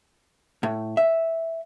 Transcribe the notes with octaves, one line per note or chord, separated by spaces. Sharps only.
A2
E5